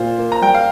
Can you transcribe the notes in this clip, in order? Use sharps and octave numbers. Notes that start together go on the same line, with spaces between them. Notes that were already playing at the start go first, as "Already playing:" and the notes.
Already playing: A#2 F4 C5
A#3
A#5
G3 G5
F5